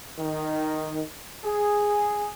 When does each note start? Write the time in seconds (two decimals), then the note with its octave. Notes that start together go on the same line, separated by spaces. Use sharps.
0.18 D#3
1.45 G#4